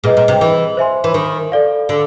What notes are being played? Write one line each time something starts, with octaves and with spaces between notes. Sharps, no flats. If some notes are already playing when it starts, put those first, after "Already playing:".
A#2 G#4 B4 D#5
A#2
C3
E3
C5 E5 G#5 C6
E3
D#3
A4 D5 F5
D3